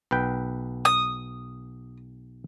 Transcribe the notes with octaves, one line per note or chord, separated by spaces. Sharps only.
B1 B4 G5
D#6